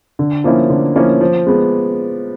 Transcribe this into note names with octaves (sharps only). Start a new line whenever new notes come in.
D3
F3 A#3 C#4 E4
D3
F3 A#3 C#4 E4
F3
G#3 B3